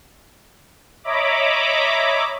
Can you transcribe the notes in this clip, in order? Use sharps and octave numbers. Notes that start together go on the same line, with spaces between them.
C#5 D#5 E5 A#5 B5 D6